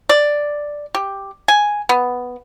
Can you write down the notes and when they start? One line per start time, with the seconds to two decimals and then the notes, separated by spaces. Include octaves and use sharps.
0.09 D5
0.95 G4
1.48 G#5
1.89 B3